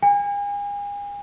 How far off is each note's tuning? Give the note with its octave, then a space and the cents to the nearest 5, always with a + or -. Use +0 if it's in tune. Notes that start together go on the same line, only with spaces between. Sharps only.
G#5 -40